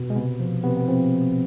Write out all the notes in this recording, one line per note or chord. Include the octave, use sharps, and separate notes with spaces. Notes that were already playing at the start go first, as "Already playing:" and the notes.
Already playing: B2
G#3
C3 B3
F3
C3 B3
B3
F3 C4